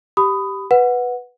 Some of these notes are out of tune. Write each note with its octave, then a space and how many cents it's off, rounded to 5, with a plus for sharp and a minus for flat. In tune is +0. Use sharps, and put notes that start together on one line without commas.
G4 -5 B5 +20 D#6 +0
B4 +0 F#5 -10